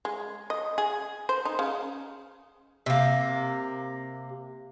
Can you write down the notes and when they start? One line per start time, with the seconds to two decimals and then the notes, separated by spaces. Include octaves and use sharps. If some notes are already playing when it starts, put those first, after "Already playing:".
0.05 G#3
0.50 D#5
0.78 G#4
1.29 C5
1.45 D#4
1.59 C#3
2.86 C3 A#3